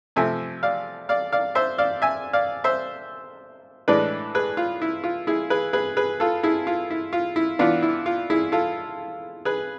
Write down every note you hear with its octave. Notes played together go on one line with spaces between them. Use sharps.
C3 F3 A3 C4 E5 G#5
D5 F5
D5 F5
D5 F5
C5 E5
D5 F5
E5 G#5
D5 F5
C5 E5
A2 E3 G#3 D4 B4 D5
G#4 B4
F4
E4
F4
E4 G#4
G#4 B4
G#4 B4
G#4 B4
F4 A4
E4 G#4
F4
E4
F4
E4
E3 B3 D4 F4
E4
F4
E4 G#4
F4 A4
G#4 B4